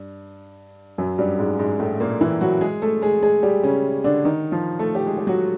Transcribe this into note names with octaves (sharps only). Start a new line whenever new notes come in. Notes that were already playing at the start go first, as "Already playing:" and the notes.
Already playing: G2
F#2 F#3
G2 G3
G#2 G#3
G#2 G#3
A2 A3
A#2 A#3
E3 E4
F#3 F#4
G#3 G#4
A3 A4
G#3 G#4
G#3 G#4
G3 G4
C#3 C#4
D3 D4
D#3 D#4
F3 F4
A3 A4
G4
G#3 G#4
G4
F#3 F#4